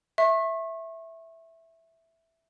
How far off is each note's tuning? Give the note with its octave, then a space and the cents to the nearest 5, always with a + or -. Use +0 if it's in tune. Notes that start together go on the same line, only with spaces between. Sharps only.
E5 +0 C#6 -35